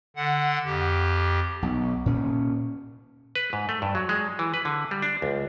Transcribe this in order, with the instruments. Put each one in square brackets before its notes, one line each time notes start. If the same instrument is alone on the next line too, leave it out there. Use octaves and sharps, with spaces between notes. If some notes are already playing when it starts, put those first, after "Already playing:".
[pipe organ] D3 F#5
F2 G4
[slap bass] B1
A#2 C#4
[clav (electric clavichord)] B4
G#2
A3
G2
F#3
G#3
E3
B4
D3
G3
D4
C#2